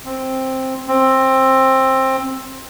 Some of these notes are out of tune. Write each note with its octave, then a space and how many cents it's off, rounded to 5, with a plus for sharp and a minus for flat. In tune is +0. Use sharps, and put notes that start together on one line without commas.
C4 +5
C4 +15